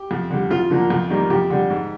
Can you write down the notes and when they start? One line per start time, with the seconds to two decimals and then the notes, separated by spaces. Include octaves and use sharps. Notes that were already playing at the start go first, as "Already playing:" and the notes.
Already playing: G4
0.11 F2
0.30 D3 G3
0.51 F2 F4
0.70 D3 F3 A#3
0.90 F2
1.10 D#3 G3 A#3
1.30 F2 G4
1.50 D3 G3
1.70 G#2